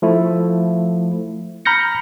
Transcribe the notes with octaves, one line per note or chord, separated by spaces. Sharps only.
F3 A3 E4
A#5 B5 F6 G6 A#6 C#7